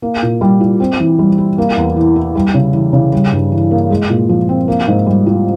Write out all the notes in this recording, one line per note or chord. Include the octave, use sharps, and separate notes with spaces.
A#3
A#2
G3
F4
C4
E3
G3
E4
A#3
E2
E3
E4
G3
C#3
E3
C#3
G3
G2
E3
A#3
G#3
A#2
F3
C4
A#3
G#2
G3
F4